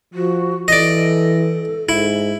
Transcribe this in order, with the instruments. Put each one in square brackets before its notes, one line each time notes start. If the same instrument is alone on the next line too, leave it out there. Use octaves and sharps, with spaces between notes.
[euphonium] F3 [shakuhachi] F#4
[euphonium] E3 [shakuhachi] A4 [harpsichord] D5 D#5
[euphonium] G#2 [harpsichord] E4